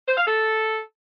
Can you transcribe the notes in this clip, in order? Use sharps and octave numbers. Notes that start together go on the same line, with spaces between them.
C5
F5
A4